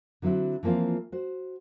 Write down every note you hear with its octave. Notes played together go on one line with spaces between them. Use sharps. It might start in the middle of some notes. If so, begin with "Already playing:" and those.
D3 F#3 C4 E4 F#4
E3 F3 A#3 C4 F4
F#4 C5